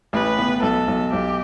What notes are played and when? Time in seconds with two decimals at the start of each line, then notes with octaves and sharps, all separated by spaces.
0.13 A1 B4
0.38 B3
0.62 B1 A4
0.88 B1
1.12 B1 G4